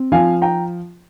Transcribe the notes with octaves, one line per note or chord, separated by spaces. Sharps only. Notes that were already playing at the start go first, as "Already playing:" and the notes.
Already playing: C4
F3 F5 G#5
G5 A#5